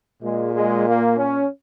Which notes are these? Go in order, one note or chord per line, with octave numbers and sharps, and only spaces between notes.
A#2 G#3
G#3
A#3
C#4